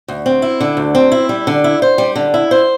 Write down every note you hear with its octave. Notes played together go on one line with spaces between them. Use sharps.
D2
C4
E4
D3
D2
C4
E4
G3
D3
E4
C5
G3
D3
E4
C5